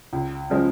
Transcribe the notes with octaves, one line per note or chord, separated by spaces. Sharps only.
C#2
C#3 F3 G#3